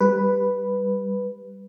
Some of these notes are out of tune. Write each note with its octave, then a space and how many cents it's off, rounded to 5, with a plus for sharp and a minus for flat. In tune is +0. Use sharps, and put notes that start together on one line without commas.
G3 +0 B4 +0